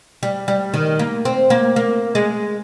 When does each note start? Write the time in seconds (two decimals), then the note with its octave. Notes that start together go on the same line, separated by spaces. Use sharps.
0.23 G3
0.48 G3
0.74 D#3
0.99 A#3
1.25 C4
1.50 A#3
1.76 A#3
2.15 G#3